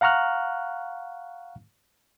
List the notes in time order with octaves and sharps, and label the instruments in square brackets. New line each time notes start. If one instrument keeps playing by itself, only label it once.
[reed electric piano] F5 F#5 A#5 C#6 F6 F#6